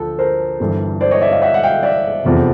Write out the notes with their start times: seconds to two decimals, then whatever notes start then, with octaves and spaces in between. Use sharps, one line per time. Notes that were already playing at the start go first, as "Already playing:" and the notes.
Already playing: D2 F3 A4
0.19 A#4 C5
0.60 G1 G2 E3
1.01 C5 D5
1.11 C#5 D#5
1.21 D5 E5
1.32 D#5 F5
1.42 E5 F#5
1.54 F#5
1.63 F5 G5
1.83 D5 E5
2.25 F1 E2 C3 F3